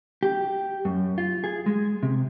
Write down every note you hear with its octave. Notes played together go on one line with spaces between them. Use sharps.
G4
F#2
F4
G#4
G#3
C3